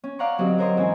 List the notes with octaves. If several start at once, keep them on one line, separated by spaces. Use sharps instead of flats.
C#4
D5 F5 F#5 A#5 C#6
D3 F#3 C4 G4 D#5
A#4 C5 C#5 D#5 C6
G#2 E3 C4 C#4 G#5